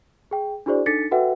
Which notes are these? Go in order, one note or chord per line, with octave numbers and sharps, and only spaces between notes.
G#4 G5
D4 E4 F#4 G#4 C5 D5
D4 D#4 A4 A6 B6 C#7
F#4 A4 B4 E5 F#5 G5